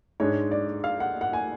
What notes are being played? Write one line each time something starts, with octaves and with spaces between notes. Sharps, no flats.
G#2 G#3 D4 C#5
D5
F5
F#5
F#5
G#5